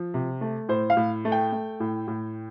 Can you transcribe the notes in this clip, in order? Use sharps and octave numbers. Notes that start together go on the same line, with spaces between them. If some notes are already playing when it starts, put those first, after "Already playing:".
Already playing: F3
C3
A3
A2 C5
F5
A2
A3
G5
A3
A2
A2